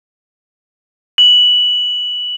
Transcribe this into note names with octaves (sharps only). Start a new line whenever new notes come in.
F#7